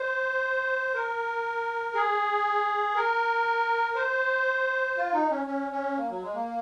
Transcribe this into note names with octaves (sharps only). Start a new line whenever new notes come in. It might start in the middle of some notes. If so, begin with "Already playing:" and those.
Already playing: C5
A#4
G#4
A#4
C5
F4
D#4
C#4
C#4
C#4
A#3
F#3
G#3
A#3